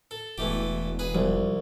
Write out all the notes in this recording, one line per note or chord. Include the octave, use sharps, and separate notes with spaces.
A4
E1 E3 A3 G4
G#4 B4
C2 F3 G3